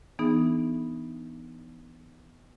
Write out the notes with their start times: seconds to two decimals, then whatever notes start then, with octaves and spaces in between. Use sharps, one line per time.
0.19 E3 B3 D4 D#4 G#4